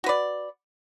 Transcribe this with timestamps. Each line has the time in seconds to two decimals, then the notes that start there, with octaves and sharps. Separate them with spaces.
0.04 F#4
0.06 B4
0.09 D5